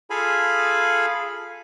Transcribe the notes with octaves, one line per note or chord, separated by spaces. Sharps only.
F4 G#4 A4 F5 G#5 B5